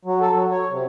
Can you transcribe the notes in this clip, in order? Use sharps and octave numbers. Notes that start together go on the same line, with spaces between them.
F#3
A4
F#3
C#5
C3